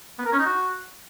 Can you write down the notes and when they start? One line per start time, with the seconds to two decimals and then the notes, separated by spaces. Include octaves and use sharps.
0.18 B3
0.25 A#4
0.32 C#4
0.39 D#4
0.45 F#4